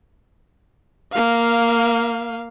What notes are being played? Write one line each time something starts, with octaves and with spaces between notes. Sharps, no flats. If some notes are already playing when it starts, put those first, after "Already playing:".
A#3 F5